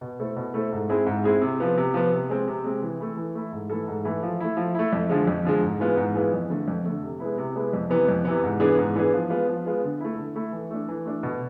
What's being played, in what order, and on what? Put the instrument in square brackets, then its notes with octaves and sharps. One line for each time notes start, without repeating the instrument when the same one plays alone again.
[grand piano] B2
A3 E4 A4 C5
B2
A3 E4 A4 C5
G#2
G#3 C4 E4 G#4
G#2
G#3 C4 E4 G#4
C3
F3 B3
C3
F3 B3
C3
G#3 C4
C3
G#3 C4
E3
A3 E4
E3
A3 E4
G#2
E3 A3 E4 A4
G#2
E3 A3 E4 A4
F3
A3 E4
F3
A3 E4
F2
D3 F3 G#3
F2
D3 F3 G#3
G#2
E3 G#3 B3 F4
G#2
E3 G#3 B3 F4
F2
D3 A3
F2
D3 A3
C3
G#3 B3 E4
C3
G#3 B3 E4
F2
C3 E3 B3
F2
C3 E3 B3
G#2
E3 B3 D4 G#4
G#2
E3 B3 D4 G#4
F3
G#3 B3 F4
F3
G#3 B3 F4
D3
A3 E4
D3
A3 E4
E3
A3 D4
E3
A3 D4
B2